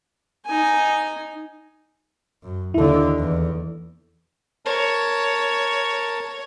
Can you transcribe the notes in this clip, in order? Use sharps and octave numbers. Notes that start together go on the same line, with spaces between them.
D#4 G#5
F#2
D#2 D3 E4 A4
E2
A#4 C#5 A5